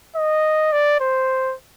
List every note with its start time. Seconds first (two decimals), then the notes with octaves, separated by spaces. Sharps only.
0.16 D#5
0.72 D5
1.00 C5